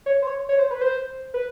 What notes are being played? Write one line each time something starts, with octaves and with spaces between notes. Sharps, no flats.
C#5
C5
C#5
C#5
C5
B4
C5
B4